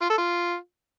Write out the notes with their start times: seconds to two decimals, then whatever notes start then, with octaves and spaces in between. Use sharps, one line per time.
0.02 F4
0.10 A4
0.18 F4